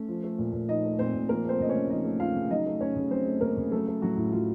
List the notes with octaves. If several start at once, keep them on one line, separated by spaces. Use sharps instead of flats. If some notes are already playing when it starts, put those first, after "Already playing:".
Already playing: A3 C#4
F3
A3
A#2
A#2
F3 D#4 D#5
A3
A#2 C4 C5
A#2
F3 A#3 A#4
A3 C4 C5
C#3 D#5
C#4 C#5
C#3
F3 D#4 D#5
A3
C#3 F4 F5
C#3
F#3 D#4 D#5
A3
C#3 C#4 C#5
C#3
F#3 C4 C5
A3
C#3 A#3 A#4
C#3
F#3 A3 A4
A3
A2 F#3 F#4
A2
F#3 F4